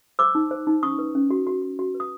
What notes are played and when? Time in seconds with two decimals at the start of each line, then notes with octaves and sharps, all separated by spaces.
0.19 C5 D6 E6
0.35 D#4
0.51 C5
0.67 D#4
0.83 C#4 C#6 D#6
0.99 B4
1.15 C#4
1.30 F#4
1.47 F#4
1.62 F#4
1.79 F#4
1.94 B4
2.00 D#6